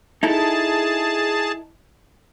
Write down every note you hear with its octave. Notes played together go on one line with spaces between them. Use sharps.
D#4 E4 G#4 A4 A5